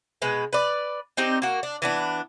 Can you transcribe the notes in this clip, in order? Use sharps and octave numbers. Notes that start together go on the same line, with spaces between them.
B2 G#3 B4
B4 D5
C4 D#4 G4 D5
A#3 F#4
D4
E3 B3 D4